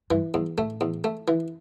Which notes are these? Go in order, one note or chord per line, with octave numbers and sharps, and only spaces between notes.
G2 E3
E2 G2
A2 A3
E2
A3
E3